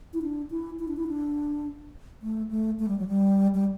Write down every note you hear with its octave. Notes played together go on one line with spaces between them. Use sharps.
E4
D4
E4
E4
D4
E4
D4
A3
A3
A3
G3
F#3
G3
G3